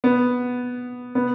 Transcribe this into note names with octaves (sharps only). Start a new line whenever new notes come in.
B3
B3